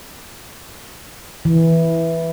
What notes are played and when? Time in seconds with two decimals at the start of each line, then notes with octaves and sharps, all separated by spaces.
1.45 E3